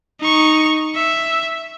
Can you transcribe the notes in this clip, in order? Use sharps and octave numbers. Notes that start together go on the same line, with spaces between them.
D#4 C#6
E5